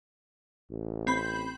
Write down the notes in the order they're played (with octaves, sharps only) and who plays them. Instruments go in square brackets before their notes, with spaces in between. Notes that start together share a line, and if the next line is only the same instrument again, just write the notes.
[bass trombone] A1
[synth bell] C4 B5 G6